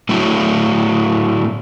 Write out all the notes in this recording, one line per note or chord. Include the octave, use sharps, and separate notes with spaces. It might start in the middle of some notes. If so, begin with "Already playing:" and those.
A2 F#3 A3 E4